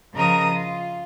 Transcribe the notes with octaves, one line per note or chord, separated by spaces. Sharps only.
C#3 F3 A#4 D#5 A#5 D#6
F4